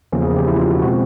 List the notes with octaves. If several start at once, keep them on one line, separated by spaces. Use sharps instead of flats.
E2 C#3 F3 A#3 C#4
G#4
G4
E4
F4
F#4
B2 G#3 C4 F#4